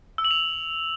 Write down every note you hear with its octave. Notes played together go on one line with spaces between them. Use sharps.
E6
F#7
F7